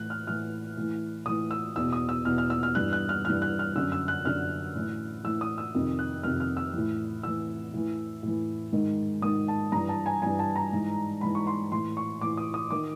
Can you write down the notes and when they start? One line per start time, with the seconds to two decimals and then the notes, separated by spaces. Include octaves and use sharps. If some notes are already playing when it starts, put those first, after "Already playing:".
Already playing: A2 E3 F#6
0.10 F6
0.27 A2 E3 F6
0.77 A2 E3
1.26 A2 E3 D#6
1.51 E6
1.76 E2 B2 E6
1.93 D#6
2.09 E6
2.25 E2 B2 F6
2.38 F6
2.50 E6
2.63 F6
2.75 G2 E3 F#6
2.93 F#6
3.09 F6
3.25 G2 E3 F6
3.42 F#6
3.59 F6
3.75 F#2 D3 E6
3.92 E6
4.08 F#6
4.25 F#2 D3 F6
4.75 A2 E3
5.24 A2 E3 E6
5.41 D#6
5.58 E6
5.75 F2 C3 D#3
5.99 F#6
6.23 F2 C3 D#3 F6
6.40 F6
6.57 E6
6.74 A2 E3
7.23 A2 E3 E6
7.73 A2 E3
8.23 A2
8.28 E3
8.73 G#2 D#3
9.22 G#2 D#3 D#6
9.48 A5
9.72 G2 E3 A#5
9.89 A5
10.06 G#5
10.22 G2 E3 G#5
10.39 A5
10.56 A#5
10.73 G#2 E3
11.21 G#2 E3 B5
11.35 C#6
11.47 C6
11.72 A2 E3 C6
11.97 C#6
12.21 A2 E3 D6
12.37 D#6
12.54 D#6
12.71 D#3 D6